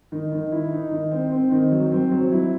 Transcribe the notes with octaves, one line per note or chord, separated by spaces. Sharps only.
D#3
D#3
E4
D#4
D#3
C4
C4
D#3
F#3
C4
F#3
E4